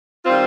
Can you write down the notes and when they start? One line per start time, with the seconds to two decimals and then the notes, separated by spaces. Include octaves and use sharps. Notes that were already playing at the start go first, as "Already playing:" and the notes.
0.25 D#3 G3 C4 F4